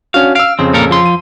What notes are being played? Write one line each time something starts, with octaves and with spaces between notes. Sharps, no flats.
C#4 D4 F#4 F5
F5 E6 D7
F2 C#3 C4
A#2 A4 A#4
F3 C6
D#7